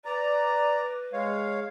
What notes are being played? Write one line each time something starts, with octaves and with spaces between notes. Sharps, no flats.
B4 D5 A#5
G#3 C#5 F5